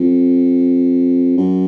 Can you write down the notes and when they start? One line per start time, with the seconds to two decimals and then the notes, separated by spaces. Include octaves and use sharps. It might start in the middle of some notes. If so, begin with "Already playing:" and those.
Already playing: F2
1.37 F#2